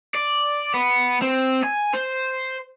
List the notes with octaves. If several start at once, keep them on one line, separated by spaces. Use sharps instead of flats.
D5
B3
C4
G#5
C5